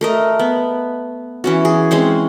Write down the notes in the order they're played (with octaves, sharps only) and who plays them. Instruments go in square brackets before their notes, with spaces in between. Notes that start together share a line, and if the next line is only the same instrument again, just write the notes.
[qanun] A3 A#4 D#5
B3
E3 C#4 F#4
G#4
G#3 C4 C#4 C5